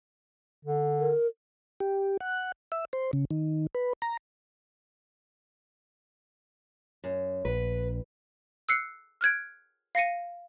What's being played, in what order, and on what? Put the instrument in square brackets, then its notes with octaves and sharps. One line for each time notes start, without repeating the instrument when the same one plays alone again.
[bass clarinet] D3
[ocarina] A#4
[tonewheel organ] G4
F#5
E5
C5
C#3
D#3
B4
A#5
[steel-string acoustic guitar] F#2
[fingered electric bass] A#1 [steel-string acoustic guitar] B4
[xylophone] E6 F#6 C7 C#7
F6 F#6 G#6 D7
F5 A#6 C#7 D#7